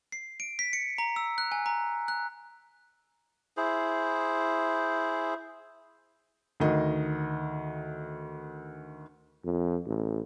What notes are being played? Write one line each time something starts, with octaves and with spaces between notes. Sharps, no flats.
C7
D7
B6
C#7
A#5
E6
F#6
G#5
A#5
F#6
E4 G#4 C5
D2 D#3 D#5
F2
A1